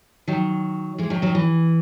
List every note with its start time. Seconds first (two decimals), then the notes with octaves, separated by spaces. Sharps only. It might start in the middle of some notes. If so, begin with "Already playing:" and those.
0.28 D#3 F#3
0.98 E3 G#3
1.10 D#3 F#3
1.22 D#3 F#3
1.35 E3